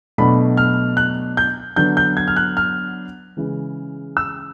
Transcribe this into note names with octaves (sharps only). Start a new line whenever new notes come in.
B2 F#3 A3 D4 B5
F6
F#6
G6
D3 F#3 B3 D4 G6
G6
G#6
F6
F#6
F6
C#3 E3 G#3
E6